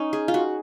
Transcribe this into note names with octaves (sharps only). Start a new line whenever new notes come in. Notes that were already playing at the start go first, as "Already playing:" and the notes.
Already playing: C#4 D#4
G#4
F4
F#4